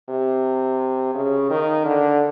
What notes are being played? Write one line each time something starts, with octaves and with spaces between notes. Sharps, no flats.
C3
C#3
D#3
D3